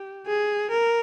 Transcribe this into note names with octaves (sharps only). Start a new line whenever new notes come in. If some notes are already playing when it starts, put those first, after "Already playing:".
Already playing: G4
G#4
A#4